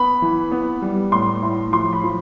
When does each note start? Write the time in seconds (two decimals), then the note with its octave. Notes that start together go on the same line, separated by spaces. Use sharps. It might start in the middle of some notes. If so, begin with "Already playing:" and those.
Already playing: B3 B5
0.22 E3
0.51 B3
0.82 G3
1.12 A2 C6
1.42 A2
1.72 F3 C6
1.93 B5
2.03 F3